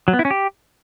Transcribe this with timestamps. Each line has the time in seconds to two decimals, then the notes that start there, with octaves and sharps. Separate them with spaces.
0.08 F#3
0.13 B3
0.19 E4
0.25 C#4
0.31 G4